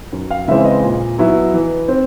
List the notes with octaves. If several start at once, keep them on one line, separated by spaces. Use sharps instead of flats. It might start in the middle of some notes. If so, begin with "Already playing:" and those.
F#2
F5
C#3 E3 G#3 C4 E5
D#5
A#2
F#3 B3 E4
E3
C4